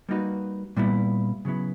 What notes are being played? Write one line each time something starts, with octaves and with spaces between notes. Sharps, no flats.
G3 A#3 D#4 F#4 B4
A#2 G3 B3 E4
C#3 F#3 B3 E4